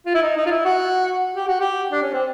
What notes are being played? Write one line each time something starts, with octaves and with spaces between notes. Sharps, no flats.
F4
E4
D#4
D#4
F4
E4
F#4
G4
F#4
G4
D4
C#4
C4